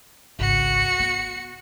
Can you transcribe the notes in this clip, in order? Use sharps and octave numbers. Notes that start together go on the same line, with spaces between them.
G#1 C#2 F#4 C#7
B3